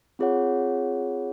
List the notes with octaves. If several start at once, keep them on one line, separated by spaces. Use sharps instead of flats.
C4 F4 G#4 C#5 F#5